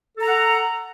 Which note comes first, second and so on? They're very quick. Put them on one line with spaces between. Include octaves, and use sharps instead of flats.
A4 A#5 F#5